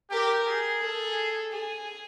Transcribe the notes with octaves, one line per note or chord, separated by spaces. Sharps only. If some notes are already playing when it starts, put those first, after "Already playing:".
G4 A#4
G#4
A4
G#4